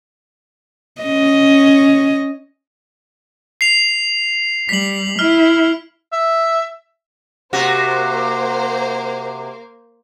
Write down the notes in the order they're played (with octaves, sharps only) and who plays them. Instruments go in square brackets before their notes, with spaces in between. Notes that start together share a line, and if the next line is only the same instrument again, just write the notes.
[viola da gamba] C#4 D#5
[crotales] C7 F7
[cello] G3 [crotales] B6 F#7
[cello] E4 [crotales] F6
[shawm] E5
[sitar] C3 F#4 [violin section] A#3 C5